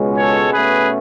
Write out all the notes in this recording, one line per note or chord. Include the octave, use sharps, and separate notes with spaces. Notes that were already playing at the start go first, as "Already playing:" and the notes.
Already playing: C#2 B2 G#3 C#4
A4 C#5
B2 A3 C#4 G#4 B4